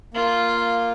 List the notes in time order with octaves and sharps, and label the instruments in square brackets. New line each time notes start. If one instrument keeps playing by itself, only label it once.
[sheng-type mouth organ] A#3 [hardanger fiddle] F4